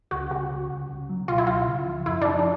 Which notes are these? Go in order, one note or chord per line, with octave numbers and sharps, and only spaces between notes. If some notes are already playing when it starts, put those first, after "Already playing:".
C#2 F#4
C#2 F#4
C#2
C#2
C#2
F#3
B2 F4
E4
C#2 F4
C#3
F3
F#2 E4
D4
F3 D#4
D4